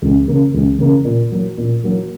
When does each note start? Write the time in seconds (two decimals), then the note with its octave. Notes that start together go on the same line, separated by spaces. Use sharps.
0.02 C#2
0.28 C#3 A#3
0.54 C#2
0.79 C#3 A#3
1.05 A#2
1.32 F#3 A#3
1.58 A#2
1.84 F#3 A#3